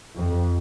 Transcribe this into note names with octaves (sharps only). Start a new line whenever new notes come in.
F2